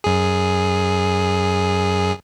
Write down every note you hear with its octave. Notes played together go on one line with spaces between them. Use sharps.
F#2 G#4